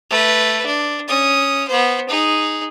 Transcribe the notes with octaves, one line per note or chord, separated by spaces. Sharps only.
A3 B4
D4
C#4 D#6
B3 C5
D#4 G#4